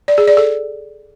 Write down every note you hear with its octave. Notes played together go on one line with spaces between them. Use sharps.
D5
G#4
D5
A4